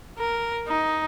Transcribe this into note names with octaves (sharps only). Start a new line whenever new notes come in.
A#4
D#4